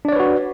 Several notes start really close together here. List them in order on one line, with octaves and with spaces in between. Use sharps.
D4 D5 C#5 B4 F#4